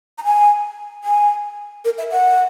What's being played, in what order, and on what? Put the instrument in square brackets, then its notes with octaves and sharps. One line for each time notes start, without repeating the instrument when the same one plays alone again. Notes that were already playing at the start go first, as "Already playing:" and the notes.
[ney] A#5
G#5
G#5
A#4
E5
F#5